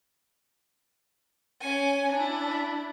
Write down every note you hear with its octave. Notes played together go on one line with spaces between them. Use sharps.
C#4 G#5
D4 E4